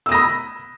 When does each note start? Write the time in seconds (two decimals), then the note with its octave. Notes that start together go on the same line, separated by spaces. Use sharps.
0.06 E6
0.09 D#6
0.12 A#6
0.14 B5